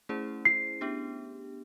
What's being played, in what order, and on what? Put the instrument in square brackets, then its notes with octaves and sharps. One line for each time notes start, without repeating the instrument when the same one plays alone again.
[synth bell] A3 C#4 E4 G#4 C5
[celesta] C7
[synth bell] B3 D4 G4